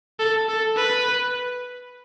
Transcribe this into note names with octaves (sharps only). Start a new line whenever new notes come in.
A4
A4
B4